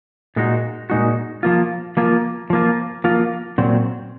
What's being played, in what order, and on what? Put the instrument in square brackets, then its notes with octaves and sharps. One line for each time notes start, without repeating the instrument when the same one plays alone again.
[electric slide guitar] A#2 G#3 D#4 F#4
A#2 G#3 D#4 F#4
F3 A#3 F4
F3 A#3 F4
F3 A#3 F4
F3 A#3 F4
A#2 F#3 C4